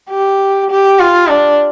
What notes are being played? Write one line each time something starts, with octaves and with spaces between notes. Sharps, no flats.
G4
G4
F4
D4